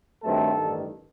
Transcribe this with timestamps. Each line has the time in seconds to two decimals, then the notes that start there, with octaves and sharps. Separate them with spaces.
0.23 G2 D#3 F#3 A3 C4 A4
0.56 A1 G2 D#3